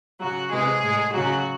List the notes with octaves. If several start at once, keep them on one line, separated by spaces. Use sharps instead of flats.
C#3 F#3 F#4
C3 E3 G#3 G#4
A2 G#3
C#3 F#3 F#4